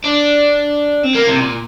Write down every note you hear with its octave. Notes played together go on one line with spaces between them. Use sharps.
D4
C4
A#3
C3
A#2